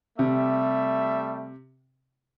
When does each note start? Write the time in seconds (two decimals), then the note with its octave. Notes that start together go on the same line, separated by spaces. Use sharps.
0.19 C3 G3 A3 E5